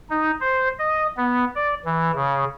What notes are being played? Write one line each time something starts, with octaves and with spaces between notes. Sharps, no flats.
D#4
C5
D#5
B3
D5
E3
C#3